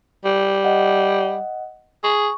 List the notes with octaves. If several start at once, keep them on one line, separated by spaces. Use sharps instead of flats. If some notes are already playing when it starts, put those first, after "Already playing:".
G3
D#5 F#5
G#4 C#6